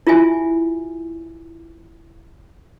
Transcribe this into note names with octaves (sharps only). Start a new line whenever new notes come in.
E4 F4 G4 E5 G#5